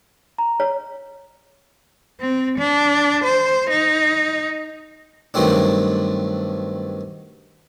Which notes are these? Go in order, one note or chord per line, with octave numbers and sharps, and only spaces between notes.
A#5
C#5
C4
D4
C5
D#4
G2 D#3 F#3 A3 C4 D4